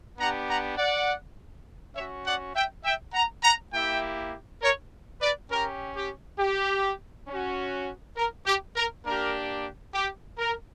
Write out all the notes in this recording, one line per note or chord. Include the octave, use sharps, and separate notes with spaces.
B3 D4 G4 F#5 A#5
F#5 A#5
D5 F#5
C#4 F#4 C#5 E5
D5 F#5
E5 G5
E5 G5
F#5 A#5
F#5 A#5
A#3 E4 G4 E5 G5
A#4 C#5
B4 D5
C#4 G4 A#4
G4
G4
C#4 F#4
A#4
G4
A#4
A#3 D4 G4 A#4
G4
A#4